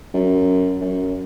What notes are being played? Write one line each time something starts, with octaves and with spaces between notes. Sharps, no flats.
F#2
F#2